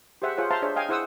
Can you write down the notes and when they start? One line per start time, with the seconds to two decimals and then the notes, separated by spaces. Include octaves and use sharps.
0.22 G4 G#4 C5 E5 F#5
0.37 F4 G#4 C5 C#5 F#5
0.50 C5 E5 F5 A5 A#5 C6
0.62 D4 G#4 C5 C#5 E5
0.76 D#5 F5 G5 G#5
0.89 E4 G#4 C5 F#5 D#6 E6